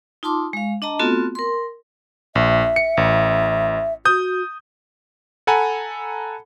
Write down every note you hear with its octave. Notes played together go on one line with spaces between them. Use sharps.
D#4 F4 A5 C6 D6
G#3 F5
D4 D#5 A5 A#5
A3 B3 C4 F4 F#4 A4
A#4 C6
A#1 E5
C#7
A1
F#4 D#6 G6
A4 F#5 G#5 A#5 B5